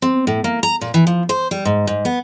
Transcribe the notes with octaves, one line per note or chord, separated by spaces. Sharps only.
C4
A2
A#3
A#5
A#2
E3
F3
C5
G3
G#2
G#2
B3